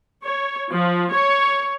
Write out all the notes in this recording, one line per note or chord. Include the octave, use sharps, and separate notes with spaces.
C#5
F3
C#5